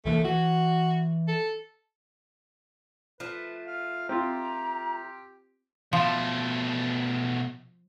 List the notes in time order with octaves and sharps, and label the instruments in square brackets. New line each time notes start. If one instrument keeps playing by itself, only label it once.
[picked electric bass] C2 E3 A#3 [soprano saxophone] A3
[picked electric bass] E3 [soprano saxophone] F#4
[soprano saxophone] A4
[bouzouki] F3 A3 [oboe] B4
[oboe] F5
[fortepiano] C4 F4 [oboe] G4 [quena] A#5
[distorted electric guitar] B2 A3 [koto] F3